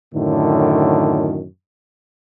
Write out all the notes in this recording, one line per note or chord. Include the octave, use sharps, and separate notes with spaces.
F#2 A2 D3 D#3